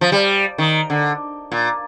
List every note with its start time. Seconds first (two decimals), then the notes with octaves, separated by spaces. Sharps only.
0.01 F3
0.12 G3
0.58 D#3
0.90 D3
1.52 A#2